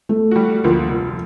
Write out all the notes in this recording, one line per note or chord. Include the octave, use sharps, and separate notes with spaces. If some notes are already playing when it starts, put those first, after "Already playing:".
A3
G3 F#4
D2 F3 A#3 F4
F1